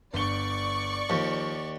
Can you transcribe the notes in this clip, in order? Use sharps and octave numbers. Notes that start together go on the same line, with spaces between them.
G1 D5 C#6 G7
D#2 F3